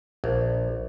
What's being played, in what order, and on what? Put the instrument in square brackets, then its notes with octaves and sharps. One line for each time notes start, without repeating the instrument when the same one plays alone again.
[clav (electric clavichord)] A#1